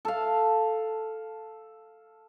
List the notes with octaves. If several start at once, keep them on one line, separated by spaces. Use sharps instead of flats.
A4 F5